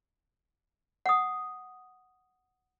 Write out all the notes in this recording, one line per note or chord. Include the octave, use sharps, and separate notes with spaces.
F#5 D#6